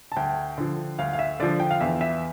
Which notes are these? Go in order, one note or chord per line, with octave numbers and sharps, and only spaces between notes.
A5
D2 G5
D3 F3
D2 F5
F5
E5
D3 F3 D5
G5
F5
E2 E5
E5